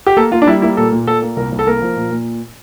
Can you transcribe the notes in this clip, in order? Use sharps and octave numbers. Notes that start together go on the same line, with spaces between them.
G4
A#3 A4
A#3 F4
D4
G3 E4
A#3 E4
A#2 A4
A#2
A#2 A4
A#3
C2 A#4
C2
A4
A#3 A#4
F3
A#2
A#2